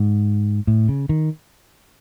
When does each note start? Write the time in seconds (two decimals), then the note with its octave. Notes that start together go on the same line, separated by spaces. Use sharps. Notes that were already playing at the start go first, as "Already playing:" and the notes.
Already playing: G#2
0.67 A2
0.89 C#3
1.09 D#3